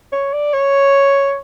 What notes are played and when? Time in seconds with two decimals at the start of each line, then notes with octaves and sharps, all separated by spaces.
0.13 C#5
0.33 D5
0.53 C#5